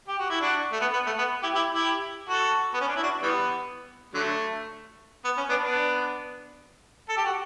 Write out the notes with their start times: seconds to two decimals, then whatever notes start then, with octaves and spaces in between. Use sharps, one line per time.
0.08 G4
0.19 F#4
0.30 E4
0.41 D4 F#4
0.72 A3
0.81 B3
0.93 B3
1.06 A3
1.18 B3
1.43 E4 G4
1.55 E4 G4
1.74 E4 G4
2.29 F#4 A4
2.74 B3
2.81 C#4
2.88 D4
2.96 E4
3.03 D4 F#4
3.22 E3 G3 B3
4.14 D3 F#3 A3
5.25 B3
5.37 C#4
5.49 B3 D4
5.62 B3 D4
7.09 A4
7.17 G4
7.25 F#4